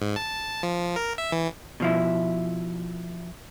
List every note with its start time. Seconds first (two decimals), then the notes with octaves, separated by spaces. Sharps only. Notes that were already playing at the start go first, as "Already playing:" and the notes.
0.02 G#2
0.16 A5
0.63 F3
0.96 A#4
1.18 E5
1.32 E3
1.80 B2 F3 E4